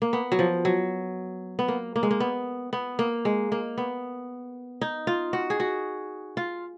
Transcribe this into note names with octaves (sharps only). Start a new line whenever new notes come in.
A#3
B3
F#3
F3
F#3
B3
A#3
A#3
G#3
A#3
B3
B3
A#3
G#3
A#3
B3
D#4
F4
F#4
G#4
F#4
F4